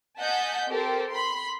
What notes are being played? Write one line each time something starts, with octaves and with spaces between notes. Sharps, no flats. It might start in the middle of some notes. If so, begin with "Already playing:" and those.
D#5 F#5 G#5 A5 G6 B6
C4 G4 A4 A#4 C5
B5 C6